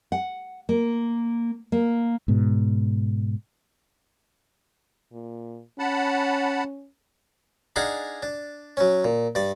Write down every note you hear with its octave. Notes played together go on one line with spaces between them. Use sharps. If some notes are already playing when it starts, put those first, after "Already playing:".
F#5
A#3
A#3
G#2 B2
A#2
C#4 F#5 A5 B5
D4 D#4 G#4 F5 F#5 G#5
D4
F#3 C#4
A#2
G2 D5